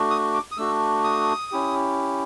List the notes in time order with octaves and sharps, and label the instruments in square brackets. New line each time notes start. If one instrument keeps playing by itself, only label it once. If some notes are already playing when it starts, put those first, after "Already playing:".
Already playing: [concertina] A3 D4 F#4
D#6
D6
D#6
A3 D4 F#4 E6
D#6
C#4 E4 G4